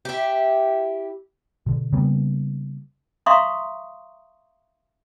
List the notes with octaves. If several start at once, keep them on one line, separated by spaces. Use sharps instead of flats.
E4 G4
B2 D3
C#3 G3 A#3 B3
E5 F5 A#5 C6 C#6 D#6